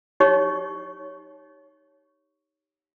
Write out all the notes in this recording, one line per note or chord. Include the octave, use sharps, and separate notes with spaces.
D#4 G4 C#5 C#6